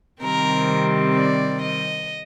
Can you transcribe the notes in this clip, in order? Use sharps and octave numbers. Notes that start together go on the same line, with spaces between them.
C3 D#3 G3 C4 A#4
D5
D#5